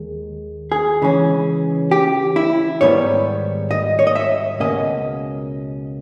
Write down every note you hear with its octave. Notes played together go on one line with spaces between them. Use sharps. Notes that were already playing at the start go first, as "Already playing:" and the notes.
Already playing: D#2 D#3 G#3
G#4
C#3 E3 G#3 C#4
G4
E4
G#2 D#3 G3 B3 C#5
D#5
C#5
D#5
E5
C#2 B2 A#3 C#4 D#5